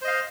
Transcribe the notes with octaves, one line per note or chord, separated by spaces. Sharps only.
C5 D#5 F5